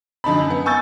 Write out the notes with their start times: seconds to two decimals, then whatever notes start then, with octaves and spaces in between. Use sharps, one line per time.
0.24 F#2 D3 D#4 A5 B5
0.50 B3
0.66 G#5 C#6 E6 G6 A6